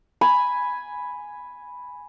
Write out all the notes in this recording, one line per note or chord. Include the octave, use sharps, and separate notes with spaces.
G#5 B5